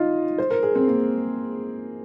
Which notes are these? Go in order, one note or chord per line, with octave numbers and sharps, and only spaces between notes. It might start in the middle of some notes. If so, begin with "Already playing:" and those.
Already playing: D#4 F4
C5
A#4
G#4
C4
A#3